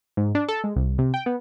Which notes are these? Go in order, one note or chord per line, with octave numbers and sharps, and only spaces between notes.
G#2
D4
A4
G#3
C2
C3
G5
B3